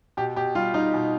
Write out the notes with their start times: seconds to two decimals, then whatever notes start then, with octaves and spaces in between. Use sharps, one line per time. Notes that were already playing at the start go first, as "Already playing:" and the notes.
0.17 B2 G4
0.36 B2 G4
0.55 G3 F4
0.74 G3 D#4
0.94 B2